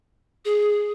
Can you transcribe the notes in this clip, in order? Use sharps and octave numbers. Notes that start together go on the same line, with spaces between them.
G#4